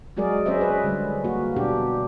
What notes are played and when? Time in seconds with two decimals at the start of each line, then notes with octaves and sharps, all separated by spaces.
0.16 F#3 G#3 F#4 G#4 A#4 D5
0.45 C#4 G#4 C5 D#5 E5
0.61 B4
0.84 D3 G3 G#3
1.24 A#3 F#4
1.56 B2 D4 G4